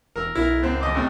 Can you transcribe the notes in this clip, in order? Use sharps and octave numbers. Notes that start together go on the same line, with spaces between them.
E1 A#4 E6
B1 E4 A#4
C#2 F#2 C4
D#2 D#5 D6
F2 A2 C3